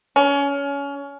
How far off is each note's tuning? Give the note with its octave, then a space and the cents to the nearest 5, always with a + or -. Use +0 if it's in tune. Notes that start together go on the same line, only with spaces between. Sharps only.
C#4 +25